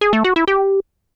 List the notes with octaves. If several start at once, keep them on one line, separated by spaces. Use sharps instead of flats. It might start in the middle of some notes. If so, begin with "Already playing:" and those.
G#4
A3
F#4
E4
G4